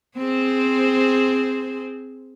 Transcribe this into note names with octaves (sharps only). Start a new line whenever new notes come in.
C4 G#4 C5